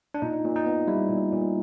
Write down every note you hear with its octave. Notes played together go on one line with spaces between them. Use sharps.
D4
A#2 D#4
A#2
D#4
B3
G3 E4
A#2
A#2